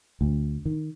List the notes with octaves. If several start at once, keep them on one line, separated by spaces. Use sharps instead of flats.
D2
D#3